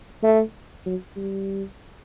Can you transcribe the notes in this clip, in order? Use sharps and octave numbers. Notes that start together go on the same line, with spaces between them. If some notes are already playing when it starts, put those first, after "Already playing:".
A3
F#3
G3